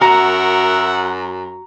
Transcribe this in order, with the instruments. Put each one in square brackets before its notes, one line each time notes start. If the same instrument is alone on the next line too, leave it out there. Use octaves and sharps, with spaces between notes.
[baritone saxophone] F#2 [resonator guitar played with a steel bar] F#4 [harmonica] A#4 E5 F#5 [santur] A#5